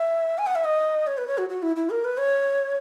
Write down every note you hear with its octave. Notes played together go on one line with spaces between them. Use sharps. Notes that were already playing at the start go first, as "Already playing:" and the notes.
Already playing: E5
G#5
F#5
E5
D#5
C#5
B4
C#5
F#4
F#4
E4
E4
A#4
B4
C#5